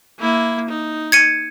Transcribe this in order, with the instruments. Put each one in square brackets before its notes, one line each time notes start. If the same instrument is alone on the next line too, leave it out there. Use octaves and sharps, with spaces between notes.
[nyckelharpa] A#3 E4
D#4
[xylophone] G#6 C#7 D#7